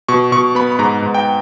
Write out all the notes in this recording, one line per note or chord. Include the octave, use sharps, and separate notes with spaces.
B2 C#6
B2 C#6
B3 B5
B5
G#2 A#5
G#2
G5